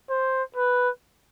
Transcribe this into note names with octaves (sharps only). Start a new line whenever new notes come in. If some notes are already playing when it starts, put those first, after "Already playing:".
C5
B4